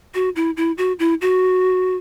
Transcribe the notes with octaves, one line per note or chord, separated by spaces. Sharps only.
F#4
E4
E4
F#4
E4
F#4